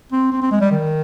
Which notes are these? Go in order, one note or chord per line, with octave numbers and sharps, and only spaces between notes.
C4
C4
C4
G#3
G3
D#3